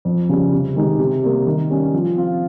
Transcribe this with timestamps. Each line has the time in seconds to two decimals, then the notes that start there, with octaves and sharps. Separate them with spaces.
0.05 F2
0.29 C#3 G3
0.52 C3
0.76 D#3 G#3 D#4 G4
0.99 C3
1.23 G3 A#3
1.47 D#3
1.70 G3 C#4
1.93 F3
2.16 C4 F4